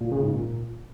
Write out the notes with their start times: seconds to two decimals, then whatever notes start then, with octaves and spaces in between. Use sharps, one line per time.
0.01 A#2
0.12 C#3
0.23 G#2
0.33 A#2